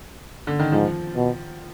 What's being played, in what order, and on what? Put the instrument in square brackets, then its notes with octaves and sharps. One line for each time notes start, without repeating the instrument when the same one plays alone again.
[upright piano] D3
D#3
[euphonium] G#2 [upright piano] F3
[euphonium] B2